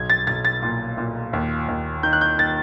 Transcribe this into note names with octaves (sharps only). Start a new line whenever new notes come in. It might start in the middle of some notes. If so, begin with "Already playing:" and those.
Already playing: B1 G#6
A6
B1 A6
A6
A#2
A#2
D#2
D#2
D#3 G6
F#6
G6
D#3 A6